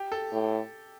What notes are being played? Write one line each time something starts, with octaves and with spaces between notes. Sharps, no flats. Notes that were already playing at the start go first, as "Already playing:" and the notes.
Already playing: G4
A4
A2